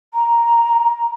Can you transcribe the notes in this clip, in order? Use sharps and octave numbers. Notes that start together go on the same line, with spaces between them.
A#5